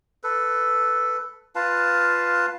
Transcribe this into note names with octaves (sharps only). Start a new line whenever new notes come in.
A4 B4
F4 B4 F5 A5